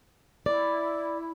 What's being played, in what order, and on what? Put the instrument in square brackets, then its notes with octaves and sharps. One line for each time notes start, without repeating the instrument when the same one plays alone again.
[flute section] E4 [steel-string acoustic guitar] D5